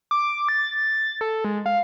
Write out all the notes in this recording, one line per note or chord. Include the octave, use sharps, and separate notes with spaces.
D6
A6
A4
G#3
F5